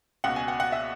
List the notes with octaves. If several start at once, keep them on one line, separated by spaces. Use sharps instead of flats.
C#2 B2 F#5
G#5
F#5
F#5
E5